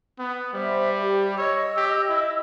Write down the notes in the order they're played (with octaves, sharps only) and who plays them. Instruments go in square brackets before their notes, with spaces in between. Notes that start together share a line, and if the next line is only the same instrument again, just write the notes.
[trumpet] B3
[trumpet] G3 [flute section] C5 E5
[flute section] G4
[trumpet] C#5 [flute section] D#5 E6
[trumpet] G4
E4